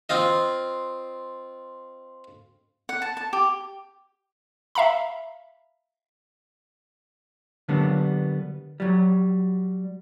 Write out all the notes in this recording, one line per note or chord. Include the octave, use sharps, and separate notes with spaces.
C4 F4 D#5
F#5
A5
A5
G4
E5 F5 A#5 B5
D3 F#3 G3 A#3 B3 D4
F#3 G3